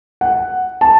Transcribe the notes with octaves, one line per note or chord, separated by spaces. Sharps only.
F#5
A5